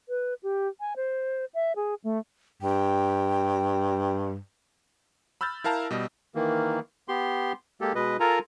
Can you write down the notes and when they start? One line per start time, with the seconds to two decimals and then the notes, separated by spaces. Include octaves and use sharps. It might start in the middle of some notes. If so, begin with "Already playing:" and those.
0.09 B4
0.43 G4
0.80 G#5
0.96 C5
1.54 E5
1.76 G#4
2.04 A3
2.62 G2 G5
5.41 B5 E6 F6 G6 A6
5.64 E4 A#4 F5 A5 A#5
5.91 B2 G3 D#5
6.35 D#3 E3 A#3
7.08 B3 G4 C6
7.81 G#3 A#3 G4 A4
7.95 B2 G#3 B4 D#5
8.20 F4 A4 A#4 G#5 A#5